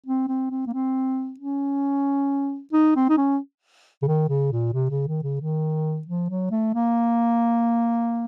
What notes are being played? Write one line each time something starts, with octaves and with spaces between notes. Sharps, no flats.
C4
C4
C4
A#3
C4
C#4
D#4
C4
D#4
C#4
C#3
D#3
C#3
A#2
C3
C#3
D#3
C#3
D#3
F3
F#3
A3
A#3